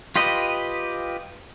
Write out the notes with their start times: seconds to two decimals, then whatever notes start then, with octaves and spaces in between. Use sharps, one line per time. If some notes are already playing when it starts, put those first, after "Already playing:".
0.16 F4 G4 B4 D#5